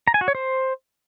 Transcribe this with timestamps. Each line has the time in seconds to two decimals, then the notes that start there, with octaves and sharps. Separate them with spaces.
0.08 A#5
0.14 G#5
0.21 F#4
0.28 C#5
0.35 C5